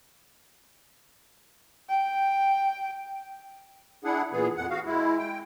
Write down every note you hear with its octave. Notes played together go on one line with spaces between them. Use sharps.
G5
D4 E4 G#4 F#5
A#2 E3 B3 G#4
F2 F#5
F#4 F5
G#3 E4
G5